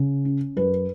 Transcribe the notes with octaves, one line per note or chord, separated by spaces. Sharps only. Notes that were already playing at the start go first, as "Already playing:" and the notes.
Already playing: C#3
C#4
F#2 B4